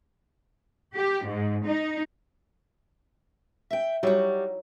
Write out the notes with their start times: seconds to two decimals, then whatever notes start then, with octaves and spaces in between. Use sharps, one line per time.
0.94 G4
1.26 G#2
1.65 D#4
3.71 E5 G5
4.03 F#3 G3 D#4 E4 F#4